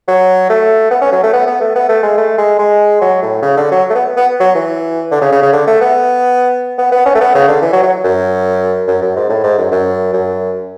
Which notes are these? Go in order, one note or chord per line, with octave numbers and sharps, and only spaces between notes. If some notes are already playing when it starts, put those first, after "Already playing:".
F#3
A3
B3
C#4
F#3
A3
B3
B3
A3
B3
A3
G#3
A3
G#3
G#3
F#3
A2
C#3
D3
F#3
A3
B3
B3
F#3
E3
D3
C#3
C#3
C#3
D3
A3
B3
B3
B3
C#4
A3
B3
C#3
D3
E3
F#3
F#3
F#2
F#2
F#2
G#2
A2
G#2
F#2
F#2
F#2